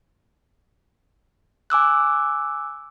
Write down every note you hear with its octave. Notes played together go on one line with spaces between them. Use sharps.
G#5 D6 E6 F#6